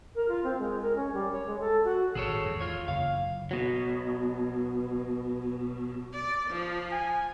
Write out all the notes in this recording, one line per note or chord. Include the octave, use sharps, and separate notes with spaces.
A#4
F4
C4
G#3
A#4
C#4
G3
C#5
G#3
A4
F#4
G#1 A2 G#4 A4 C#5
E2
F4 C#5
F#1 F5
B2 F#3
D5
F3
G#5